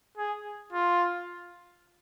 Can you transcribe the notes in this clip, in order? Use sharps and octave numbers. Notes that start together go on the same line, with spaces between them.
G#4
F4